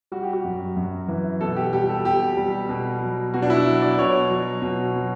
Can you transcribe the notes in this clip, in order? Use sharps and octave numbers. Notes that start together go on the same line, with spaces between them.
G3 F#4
G4
F#4
F#2
F#2
E3
B2 A4
G4
G3 G4
A4
B2 G4
G3
B2
F#3
B2 F#4
D4
E4
F#3
D5
B2 C#5
F#3
B2
F#3